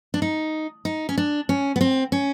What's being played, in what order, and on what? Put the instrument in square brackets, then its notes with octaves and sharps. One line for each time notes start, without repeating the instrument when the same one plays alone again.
[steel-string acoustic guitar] D4
D#4
D#4
C#4
D4
C#4
B3
C4
C#4